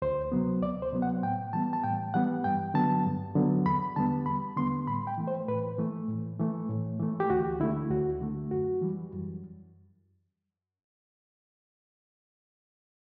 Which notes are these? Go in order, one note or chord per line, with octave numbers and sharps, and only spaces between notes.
D2 C5
C3 F#3 B3
D2 D5
C5
C3 F#3 B3
F#5
A2 G5
E3 G3 B3 A5
A5
A2 G5
E3 G3 B3 F#5
G2 G5
D3 F#3 B3 A5
G2
D3 F#3 B3
E2 B5
D3 G3 B3 A5
E2 B5
D3 G3 B3 C6
A2 B5
G5
E3 A3
C5
A2 B4
E3 A3
A2
E3 A3
A2
E3 A3
G4
D2 F#4
D3 A3 E4
D2 F#4
D3 A3
F#2 F#4
E3 G3
F#2